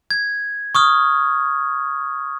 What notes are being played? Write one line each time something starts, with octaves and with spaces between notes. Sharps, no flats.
G#6
C#6 D#6 F6